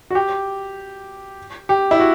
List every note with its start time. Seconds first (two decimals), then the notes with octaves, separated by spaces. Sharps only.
0.10 F#4
0.15 G4
1.69 G4
1.91 E4
2.00 F#4